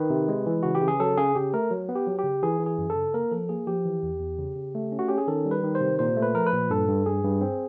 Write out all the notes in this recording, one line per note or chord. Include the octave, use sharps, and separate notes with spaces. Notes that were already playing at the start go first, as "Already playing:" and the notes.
Already playing: D#3 B4
C3
G#3
E3
C#3 F#4
G4
C#3
G#4
F#3 A4
C#3 G#4
C#3 G4
A3 A#4
F#3
B3
G4
F#3
G4
C#3
E3 G#4
E3
G#4
F#2
A4
C#3
A#3 A#4
F3 A4
A#3 G#4
F3 G4
E3
E2
E2
C#3
C#3
A3
C#4
F#4
C#4 G4
G#4
D#3 A4
G3
B4
D#3
C5
C3
A#2 C5
A3
B4
F3 A#4
B4
A#2
G2 A4
G2
G2 G#4
G2
C4